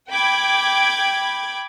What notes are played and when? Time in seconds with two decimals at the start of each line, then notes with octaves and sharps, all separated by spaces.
0.10 G5 B5 D6 G#6